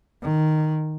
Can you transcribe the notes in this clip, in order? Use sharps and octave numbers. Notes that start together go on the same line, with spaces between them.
D#3